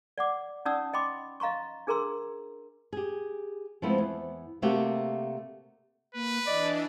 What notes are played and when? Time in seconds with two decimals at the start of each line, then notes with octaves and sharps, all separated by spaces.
0.18 D5 F#5 D6
0.65 C#4 D#4 D5 F#5 D#6 E6
0.93 D#5 G5 B5 C6 D6
1.40 D#5 F5 A#5 C6 C#6
1.87 D4 G#4 A#4 A#5 C6 E6
2.93 G4 G#4
3.82 F3 G#3 A3 B3 C4 E4
3.98 E2
4.62 C3 A3 A#3 F#4 G4
6.15 A#3 B4
6.46 E3 D4 D5 D#5